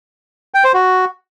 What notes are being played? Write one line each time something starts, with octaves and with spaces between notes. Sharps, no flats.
G5
C5
F#4